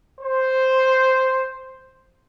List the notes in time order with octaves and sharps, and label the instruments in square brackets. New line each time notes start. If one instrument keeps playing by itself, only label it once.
[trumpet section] C5